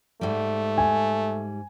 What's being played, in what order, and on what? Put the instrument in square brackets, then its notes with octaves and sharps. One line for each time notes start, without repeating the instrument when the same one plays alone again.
[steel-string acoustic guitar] G#2 G3 [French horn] A3
[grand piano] G#5